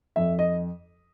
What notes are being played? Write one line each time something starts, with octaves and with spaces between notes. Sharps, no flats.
F2 E5
D#5